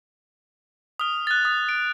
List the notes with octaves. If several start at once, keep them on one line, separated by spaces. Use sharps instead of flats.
D#6 F6
F#6 A6
D#6
D7